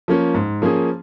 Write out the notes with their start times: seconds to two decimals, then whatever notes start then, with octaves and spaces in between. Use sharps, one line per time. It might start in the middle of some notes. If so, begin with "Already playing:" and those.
0.08 F3 A#3 C#4
0.35 G#2
0.62 F3 A#3 C#4 G#4